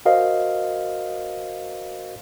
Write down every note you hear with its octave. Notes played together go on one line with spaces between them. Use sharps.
F#4 A#4 C5 D#5 F5